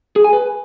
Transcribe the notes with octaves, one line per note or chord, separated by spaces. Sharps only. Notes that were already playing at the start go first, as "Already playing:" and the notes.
G#4
G#5
B4